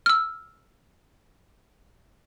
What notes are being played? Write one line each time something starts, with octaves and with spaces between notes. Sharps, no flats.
E6 F6